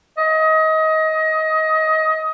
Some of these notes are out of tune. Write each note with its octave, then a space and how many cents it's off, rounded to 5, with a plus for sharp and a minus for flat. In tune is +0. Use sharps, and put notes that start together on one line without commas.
D#5 +25